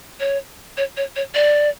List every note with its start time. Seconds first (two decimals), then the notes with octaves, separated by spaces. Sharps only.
0.20 C#5
0.77 C#5
0.97 C#5
1.16 C#5
1.35 D5